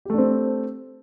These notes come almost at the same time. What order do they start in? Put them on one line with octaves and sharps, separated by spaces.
G4 A3 D4 C4